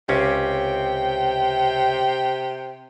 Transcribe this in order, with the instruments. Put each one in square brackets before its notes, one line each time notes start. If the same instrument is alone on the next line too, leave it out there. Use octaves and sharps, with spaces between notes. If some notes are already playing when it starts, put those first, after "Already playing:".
[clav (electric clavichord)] C#2 C#4 [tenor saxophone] C3 [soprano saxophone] G5